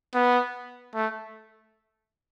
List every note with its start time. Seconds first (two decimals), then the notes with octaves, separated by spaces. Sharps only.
0.14 B3
0.95 A3